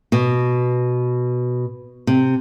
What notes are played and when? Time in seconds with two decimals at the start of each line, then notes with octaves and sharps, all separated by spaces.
0.12 B2
2.07 C3